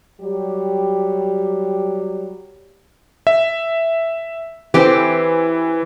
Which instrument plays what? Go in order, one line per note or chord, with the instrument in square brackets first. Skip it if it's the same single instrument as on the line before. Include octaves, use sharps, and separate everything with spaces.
[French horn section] F#3 G3 G4
[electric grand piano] E5
[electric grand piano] E3 [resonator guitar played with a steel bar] C4 G4